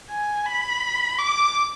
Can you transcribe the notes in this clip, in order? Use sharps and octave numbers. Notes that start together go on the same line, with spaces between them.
G#5
B5
D6